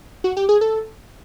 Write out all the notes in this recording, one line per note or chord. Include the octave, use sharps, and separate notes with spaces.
F#4
G4
G#4
A4